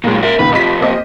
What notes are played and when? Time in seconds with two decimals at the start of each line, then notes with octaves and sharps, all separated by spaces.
0.04 A#2 D#3 F#3 G#3
0.23 A#4 E5
0.39 C#2 A#2 D#3 B4
0.52 F2 C3 D#5 B5 B6
0.81 A#3 C4 D#5